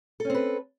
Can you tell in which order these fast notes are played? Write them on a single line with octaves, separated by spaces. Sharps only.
A4 C#4 C4 B4